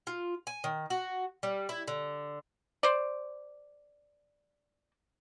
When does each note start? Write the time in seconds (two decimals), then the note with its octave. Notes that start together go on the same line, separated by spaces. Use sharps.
0.07 F4
0.47 G#5
0.64 D#3
0.90 F#4
1.43 G3
1.69 E4
1.88 D3
2.83 C5 D5